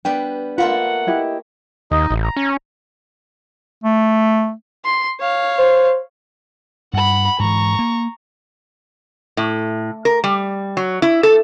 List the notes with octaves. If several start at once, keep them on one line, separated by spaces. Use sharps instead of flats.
G3 B3 D4 G5
A3 A#3 F4 F#5 B5
E4 G4 D#5
D#2 D#4 D#5
A1
A#5
C#4
A3
C6
C#5 F5
C5
G2 F#5 B5
G#2 E3 A#5 C#6
A#3
A2
A#4
G3
F#3
E4
A4